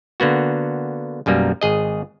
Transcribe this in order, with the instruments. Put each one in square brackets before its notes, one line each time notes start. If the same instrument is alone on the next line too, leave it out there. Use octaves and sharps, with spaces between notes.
[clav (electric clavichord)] D3 A#3 B3 F#4
B1 F#2 G3 A#3
G#1 G#4 D#5